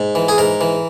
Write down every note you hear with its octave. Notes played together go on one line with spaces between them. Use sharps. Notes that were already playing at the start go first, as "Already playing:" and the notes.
Already playing: G#2
E3
G#4
G#2 A#4
E3